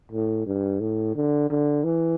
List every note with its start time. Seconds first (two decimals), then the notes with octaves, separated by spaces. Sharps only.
0.12 A2
0.46 G2
0.80 A2
1.16 D3
1.50 D3
1.84 E3